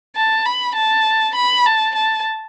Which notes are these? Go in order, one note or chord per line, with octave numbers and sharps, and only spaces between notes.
A5
B5
A5
B5
A5
A5